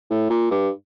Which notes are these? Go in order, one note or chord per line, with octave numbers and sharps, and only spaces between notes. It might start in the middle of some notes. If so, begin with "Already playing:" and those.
A2
A#2
G2